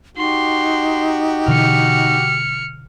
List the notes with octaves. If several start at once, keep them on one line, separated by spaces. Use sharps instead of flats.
D#4 F#4 G4 C6
B2 D3 E3 F6 C#7